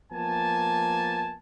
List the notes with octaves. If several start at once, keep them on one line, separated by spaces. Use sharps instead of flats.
F3 A#3 B3 G#5 A5